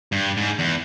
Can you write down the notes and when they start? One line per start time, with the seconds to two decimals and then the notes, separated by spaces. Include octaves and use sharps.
0.12 G2
0.37 G#2
0.59 E2